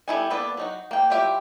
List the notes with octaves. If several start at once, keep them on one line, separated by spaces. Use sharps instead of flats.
G3 B3 E4 A4 G#5
A#3 B3 A4 B4 D5
F#3 D#4 F#4
A#3 G5
F#3 E4 F4 G4 E5